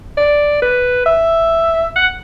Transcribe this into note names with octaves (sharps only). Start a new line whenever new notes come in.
D5
B4
E5
F#5